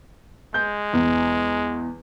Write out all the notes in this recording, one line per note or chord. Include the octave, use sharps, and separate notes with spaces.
G#3 G6
E2